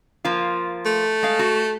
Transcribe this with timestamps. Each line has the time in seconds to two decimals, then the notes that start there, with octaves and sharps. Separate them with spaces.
0.25 F3 A#3 F4
0.86 A3
1.23 G#3 F5
1.39 F#4